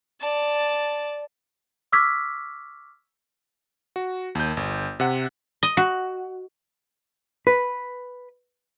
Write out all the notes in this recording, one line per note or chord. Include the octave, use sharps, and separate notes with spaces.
D5 A5
C#6 D6 E6 F6 G#6 B6
F#4
D#2 G6
G1
C3 F#5
D#5
F#4
B4